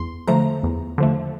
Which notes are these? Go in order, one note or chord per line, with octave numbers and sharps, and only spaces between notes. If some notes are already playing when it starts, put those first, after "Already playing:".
Already playing: E2 C6
D3 F3 A3 A#5
E2
D3 F3 A3